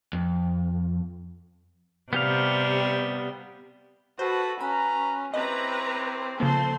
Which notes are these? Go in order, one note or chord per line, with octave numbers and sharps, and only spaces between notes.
F2
C3 G3 B3 G4 F5
F#4 A4 B4 C5 A5
C#4 B4 A#5 B5
C4 E4 G4 B4 C#5 D#5 A#5
C#3 F3 A#3 C4 A4 C5 C6